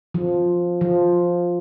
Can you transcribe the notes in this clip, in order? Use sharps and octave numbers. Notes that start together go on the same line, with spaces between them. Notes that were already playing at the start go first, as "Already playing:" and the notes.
F3
F3